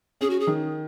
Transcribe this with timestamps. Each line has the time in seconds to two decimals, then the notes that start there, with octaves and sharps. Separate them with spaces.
0.21 C#4 G#4
0.30 F#4
0.40 G#4
0.47 D#3